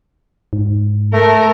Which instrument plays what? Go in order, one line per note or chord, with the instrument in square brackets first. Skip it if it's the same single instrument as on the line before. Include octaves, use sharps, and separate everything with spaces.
[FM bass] G#2
[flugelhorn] A3 [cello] A#4